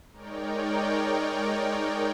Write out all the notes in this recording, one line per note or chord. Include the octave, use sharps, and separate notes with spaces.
G#3 D#4 A#4 C#5 D5 G5